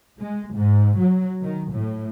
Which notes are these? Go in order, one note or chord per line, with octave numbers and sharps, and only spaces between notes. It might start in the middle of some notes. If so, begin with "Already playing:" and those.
G#3
G#2
F#3
D#3
A2